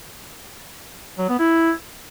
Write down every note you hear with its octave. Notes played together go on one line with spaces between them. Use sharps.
F#3
B3
E4